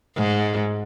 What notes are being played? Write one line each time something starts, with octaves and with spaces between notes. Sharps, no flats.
G#2